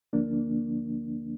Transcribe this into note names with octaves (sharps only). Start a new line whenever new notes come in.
D2 D3 F3 A#3 D4